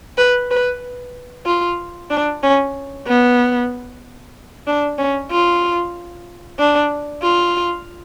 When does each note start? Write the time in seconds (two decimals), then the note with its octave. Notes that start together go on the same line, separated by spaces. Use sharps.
0.18 B4
0.51 B4
1.46 F4
2.10 D4
2.43 C#4
3.07 B3
4.67 D4
4.98 C#4
5.31 F4
6.59 D4
7.22 F4